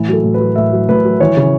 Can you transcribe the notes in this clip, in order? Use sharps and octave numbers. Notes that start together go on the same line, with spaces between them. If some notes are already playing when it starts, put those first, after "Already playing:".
Already playing: A2 E3
F#3 A4
A2
B4
F#3
A2 E5
F#3
A2 B4
F#3
E3 C#5
C#3